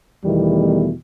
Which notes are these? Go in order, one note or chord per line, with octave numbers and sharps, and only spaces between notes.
E2 B2 D#3 E3 G3 A3